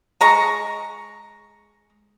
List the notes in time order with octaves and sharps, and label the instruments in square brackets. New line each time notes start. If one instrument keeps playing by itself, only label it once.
[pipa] G#3 A#5 C#6